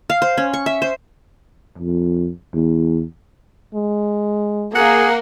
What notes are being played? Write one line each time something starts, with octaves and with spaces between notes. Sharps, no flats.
F5
C5
C#4
C#6
E5
C5
F2
E2
G#3
A#3 G#4 F#5